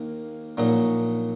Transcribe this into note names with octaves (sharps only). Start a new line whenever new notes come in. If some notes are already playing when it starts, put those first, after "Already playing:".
Already playing: D#2 A#3
A#1 A#2 F#3 D#4